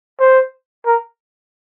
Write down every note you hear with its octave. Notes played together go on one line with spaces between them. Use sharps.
C5
A#4